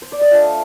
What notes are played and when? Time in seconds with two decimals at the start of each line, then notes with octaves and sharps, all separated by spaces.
0.02 C5
0.12 D5
0.21 D#5
0.31 A3 D4 F4 F5